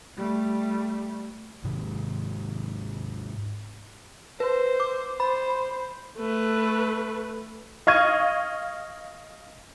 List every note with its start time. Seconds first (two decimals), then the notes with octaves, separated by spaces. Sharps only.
0.17 G3 A3
1.64 G#2 C3 D#3 G#3
4.40 B4 C5
4.80 D6
5.20 C5 B5
6.18 A3 B4
7.87 D#5 F5 C#6 F6 G#6 D#7